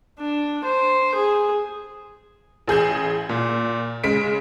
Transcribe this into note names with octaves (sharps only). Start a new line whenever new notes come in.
D4
C5
G#4
A1 G#4 G6 E7
A#2
C#3 G#3 B6 D7